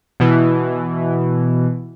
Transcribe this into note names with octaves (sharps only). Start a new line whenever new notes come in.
B2 E3